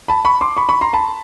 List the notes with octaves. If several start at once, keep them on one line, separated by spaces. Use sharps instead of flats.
A5 B5
B5 C#6
C6 D6
B5 C#6
B5 C#6
A#5 C6
A5 B5